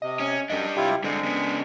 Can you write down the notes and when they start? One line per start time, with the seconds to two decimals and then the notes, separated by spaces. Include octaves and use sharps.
0.02 C3 D#5
0.20 C#4
0.50 F#2 G3 D4 D#5
0.77 C3 E4 F4 G4
1.04 G2 D3 G#3 C4
1.24 C#3 B3